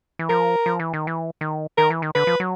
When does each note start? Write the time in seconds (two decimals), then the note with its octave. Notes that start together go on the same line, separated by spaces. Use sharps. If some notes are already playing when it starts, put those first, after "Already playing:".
0.19 E3
0.29 F3 A#4
0.66 F3
0.79 E3
0.93 D#3
1.07 E3
1.41 D#3
1.78 D#3 A#4
1.90 E3
2.02 D#3
2.15 D3 B4
2.27 F3
2.40 F#3